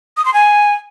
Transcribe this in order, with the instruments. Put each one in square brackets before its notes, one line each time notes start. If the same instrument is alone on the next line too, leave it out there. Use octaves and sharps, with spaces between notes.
[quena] D#6
C6
G#5